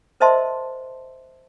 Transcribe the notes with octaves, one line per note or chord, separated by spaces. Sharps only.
A#4 C5 D#5 E5 A5 C6